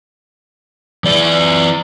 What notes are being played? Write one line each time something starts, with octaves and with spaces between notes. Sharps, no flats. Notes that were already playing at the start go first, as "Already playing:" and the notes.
E3 D5